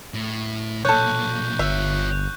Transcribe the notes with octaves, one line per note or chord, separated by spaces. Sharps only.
A2
B1 A#2 A4 C#5 C#6 F#6 G6
G1 F4 C#5 E5